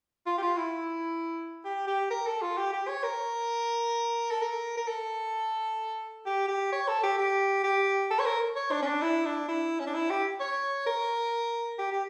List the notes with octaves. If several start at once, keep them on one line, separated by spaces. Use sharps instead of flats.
F4
G4
F4
E4
G4
G4
A#4
A4
F4
G4
G4
C#5
A#4
A4
A#4
A#4
A4
G4
G4
C#5
A4
G4
G4
G4
A4
C#5
A#4
C#5
D4
C#4
D4
E4
D4
E4
C#4
D4
E4
G4
C#5
A#4
G4
G4